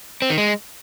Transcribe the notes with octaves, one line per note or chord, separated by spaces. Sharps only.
C4
D#3
G#3